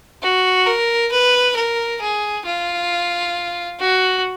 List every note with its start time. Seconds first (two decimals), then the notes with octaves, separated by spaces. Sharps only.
0.23 F#4
0.66 A#4
1.11 B4
1.56 A#4
2.01 G#4
2.46 F4
3.80 F#4